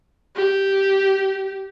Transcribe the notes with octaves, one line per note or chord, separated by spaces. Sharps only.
G4